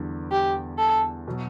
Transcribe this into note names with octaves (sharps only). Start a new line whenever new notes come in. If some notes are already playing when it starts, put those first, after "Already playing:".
Already playing: E2 D3 G3 B3
G4
A4
B2 F#3